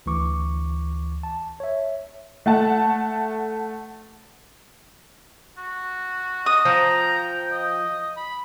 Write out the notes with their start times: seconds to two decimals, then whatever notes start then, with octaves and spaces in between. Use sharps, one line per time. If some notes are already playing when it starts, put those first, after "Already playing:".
0.06 D2 E3 C#6 D6
1.23 A5
1.60 C#5 E5
2.46 A3 F#5 A5
5.58 F#4
6.46 D#5 D#6
6.65 F3 G5 A#5
7.51 D#5
8.17 B5